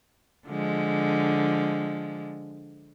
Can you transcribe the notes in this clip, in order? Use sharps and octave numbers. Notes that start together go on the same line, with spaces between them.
D3 F3 G#3